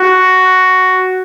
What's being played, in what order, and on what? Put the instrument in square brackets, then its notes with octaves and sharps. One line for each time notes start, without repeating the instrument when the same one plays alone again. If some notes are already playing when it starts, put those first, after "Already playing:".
Already playing: [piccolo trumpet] F#4